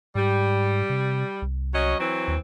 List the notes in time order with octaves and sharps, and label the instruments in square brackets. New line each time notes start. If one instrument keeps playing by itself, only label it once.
[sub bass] G#2 [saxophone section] G3
[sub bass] C3
C2
[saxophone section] F#3 C#4 D#5
E3 F#3 C4
[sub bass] D#2